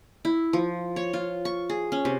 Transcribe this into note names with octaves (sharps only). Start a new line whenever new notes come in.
E4
F3
C#5
F4
C#6
G#4
C#4
C3